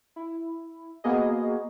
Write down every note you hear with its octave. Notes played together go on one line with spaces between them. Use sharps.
E4
A#3 B3 F#4 G#4 D#5